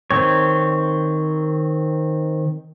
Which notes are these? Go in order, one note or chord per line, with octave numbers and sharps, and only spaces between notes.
D#3 C4 C#5